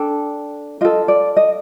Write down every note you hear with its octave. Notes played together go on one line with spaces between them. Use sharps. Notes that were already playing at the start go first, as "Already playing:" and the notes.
Already playing: D4 A4 G5
F4 A4 D#5
D5
D#5